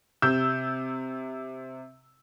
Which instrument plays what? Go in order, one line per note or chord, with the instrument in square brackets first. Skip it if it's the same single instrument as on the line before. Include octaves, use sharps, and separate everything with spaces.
[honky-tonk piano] C3 E6 G6